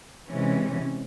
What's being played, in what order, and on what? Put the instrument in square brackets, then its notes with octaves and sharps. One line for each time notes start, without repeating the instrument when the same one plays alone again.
[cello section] C3 E3 G#3 C#4